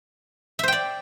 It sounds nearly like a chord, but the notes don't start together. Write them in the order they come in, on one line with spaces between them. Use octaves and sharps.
E5 C5 G5 D5